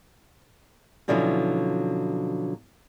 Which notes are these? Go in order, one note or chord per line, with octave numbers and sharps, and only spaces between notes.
B2 D3 F3 F#3 C#4 E4